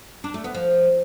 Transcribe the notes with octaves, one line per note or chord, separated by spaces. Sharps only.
D4
A3
B3
F3